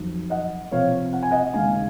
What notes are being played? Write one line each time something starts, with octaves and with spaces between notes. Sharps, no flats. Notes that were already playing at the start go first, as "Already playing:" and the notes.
Already playing: F2 D#3 F#3
D#5 F#5
C3 F3 C4 C#5 F5
F#5
G#5
D#5 F#5
D#2 C#3 G#3 C#4 F5 G#5